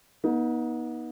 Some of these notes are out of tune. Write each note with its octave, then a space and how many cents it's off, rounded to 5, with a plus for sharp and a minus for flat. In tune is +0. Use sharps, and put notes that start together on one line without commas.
B3 -35 D#4 +20